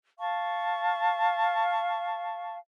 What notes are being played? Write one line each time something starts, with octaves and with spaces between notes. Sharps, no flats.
F5 A5 C#6